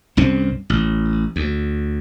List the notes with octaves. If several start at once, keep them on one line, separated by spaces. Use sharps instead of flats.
C2 G2 C4 C#4
A1
D2